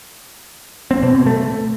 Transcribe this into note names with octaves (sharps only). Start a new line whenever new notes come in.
C4
B2
B2
A3